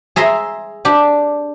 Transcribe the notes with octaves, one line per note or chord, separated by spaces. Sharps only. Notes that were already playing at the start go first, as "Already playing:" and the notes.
G#4 E5 A#5 C6
D4 G4